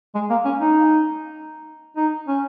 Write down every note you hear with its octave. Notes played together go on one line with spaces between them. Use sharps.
G#3
A#3
C#4
D#4
D#4
C#4